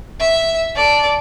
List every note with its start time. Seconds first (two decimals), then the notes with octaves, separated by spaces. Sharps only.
0.20 E5
0.76 A4 D5